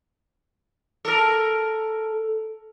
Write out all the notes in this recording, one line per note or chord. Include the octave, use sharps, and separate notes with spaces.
A4 A#4